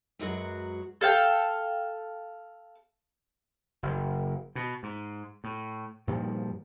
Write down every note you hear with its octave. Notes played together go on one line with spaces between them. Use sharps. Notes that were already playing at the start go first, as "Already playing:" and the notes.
F#2 F#3 G#3 F#4 B4
A4 F5 G5
F#1
B2
G#2
A2
G2 A#2 D#3 F3